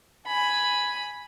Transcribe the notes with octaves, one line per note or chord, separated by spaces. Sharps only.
G#5 B5